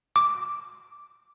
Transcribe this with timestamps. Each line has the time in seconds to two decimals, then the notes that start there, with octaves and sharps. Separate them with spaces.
0.16 D6